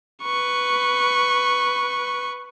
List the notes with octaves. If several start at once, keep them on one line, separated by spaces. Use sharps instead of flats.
B4 C#6